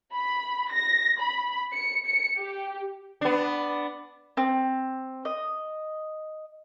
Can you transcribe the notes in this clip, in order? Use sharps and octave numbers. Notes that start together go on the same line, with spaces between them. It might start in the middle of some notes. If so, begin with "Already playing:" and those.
B5
A#6
B5
C#7
C#7
G4
B3 D4
C4
D#5